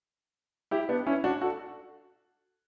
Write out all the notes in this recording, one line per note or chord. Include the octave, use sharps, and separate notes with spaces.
E4 G4
B3 D4
C#4 E4
D4 F#4
F#4 A4